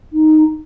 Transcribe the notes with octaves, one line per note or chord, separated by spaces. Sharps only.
D#4